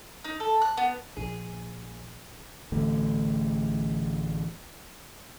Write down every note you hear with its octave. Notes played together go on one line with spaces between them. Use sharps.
D#4
A4
F#6
B3
A#1 G#4
A1 D3 A3